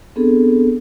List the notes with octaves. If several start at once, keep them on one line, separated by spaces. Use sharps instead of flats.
B3 C4 D4 G#4 A4